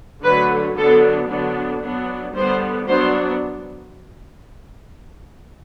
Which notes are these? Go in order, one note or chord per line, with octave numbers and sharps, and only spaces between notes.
D3 F#3 A3 B4
D3 F#3 B3 D4 A4
D3 F#3 B3 D4
F#3 B3 D4
D3 G3 B3 C5
F#3 B3 D4 C5